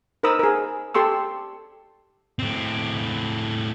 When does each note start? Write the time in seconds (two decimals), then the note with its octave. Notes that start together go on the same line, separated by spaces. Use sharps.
0.23 D#4 A#4 C5 B5 D#6 E6
0.39 G#4 A#4
0.94 G4 A4 C6 C#6 E6
2.39 A2 C4